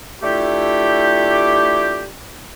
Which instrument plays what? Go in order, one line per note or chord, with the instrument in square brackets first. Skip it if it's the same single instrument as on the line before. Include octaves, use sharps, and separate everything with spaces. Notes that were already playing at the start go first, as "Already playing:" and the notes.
[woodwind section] A3 D4 E4 F4 G4